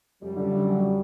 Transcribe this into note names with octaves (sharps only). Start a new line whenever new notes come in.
F#2 G3
D3
F#3
F#2